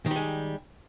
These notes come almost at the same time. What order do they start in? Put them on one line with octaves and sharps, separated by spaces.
D#3 G3 G#3